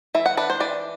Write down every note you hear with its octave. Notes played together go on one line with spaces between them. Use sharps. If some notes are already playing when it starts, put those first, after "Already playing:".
E3 E5
F#5
D4 B4
C5
E3 D5